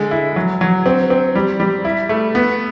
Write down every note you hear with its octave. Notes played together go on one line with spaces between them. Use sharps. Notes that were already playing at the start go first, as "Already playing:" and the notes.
Already playing: D3 G#3
E4
F#3
F#3
C4
C4
G3
G3
E4
A3
B3